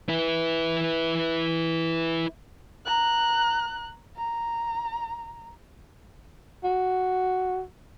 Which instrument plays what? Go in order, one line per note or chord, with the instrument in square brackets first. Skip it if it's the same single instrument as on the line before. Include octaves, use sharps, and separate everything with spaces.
[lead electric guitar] E4 B4
[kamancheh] A#5 F#6
A#5
[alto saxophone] F#4